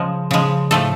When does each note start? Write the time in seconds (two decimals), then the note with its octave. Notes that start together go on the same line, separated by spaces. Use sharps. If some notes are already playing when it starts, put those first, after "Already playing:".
Already playing: C#3 F3 G#3
0.31 C#3 F3 G#3
0.71 A2 F3 A3 A4